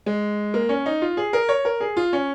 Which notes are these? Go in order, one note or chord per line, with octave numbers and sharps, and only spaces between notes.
G#3
A#3
C#4
D#4
F4
G#4
A#4
C#5
A#4
G#4
F4
C#4